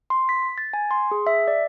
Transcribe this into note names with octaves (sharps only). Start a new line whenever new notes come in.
C6
B6
A6
G#5
C6
G#4
E5
D5